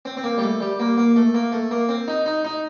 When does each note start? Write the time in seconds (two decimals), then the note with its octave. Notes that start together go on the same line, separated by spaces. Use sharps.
0.05 C4
0.17 C4
0.24 A#3
0.38 G3
0.42 A3
0.60 G3
0.79 A#3
0.97 A#3
1.16 A3
1.34 A#3
1.52 A3
1.71 A#3
1.89 C4
2.08 D#4
2.26 D#4
2.45 D#4